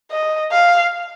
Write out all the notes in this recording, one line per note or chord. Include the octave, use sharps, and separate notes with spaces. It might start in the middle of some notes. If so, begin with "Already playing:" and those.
D#5
F5